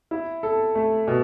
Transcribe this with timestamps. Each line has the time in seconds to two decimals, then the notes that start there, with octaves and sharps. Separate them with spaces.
0.11 E4
0.43 A4
0.75 A3
1.07 B2